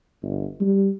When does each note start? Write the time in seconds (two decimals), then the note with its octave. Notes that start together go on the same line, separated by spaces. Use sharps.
0.22 G1
0.61 G3